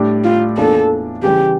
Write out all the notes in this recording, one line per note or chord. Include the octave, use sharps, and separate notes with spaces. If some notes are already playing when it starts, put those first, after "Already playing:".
Already playing: A2 G3 D4 G4 D5
F4
E2 E3 A#3 D4 F4 A4
C#3 E3 G3 G4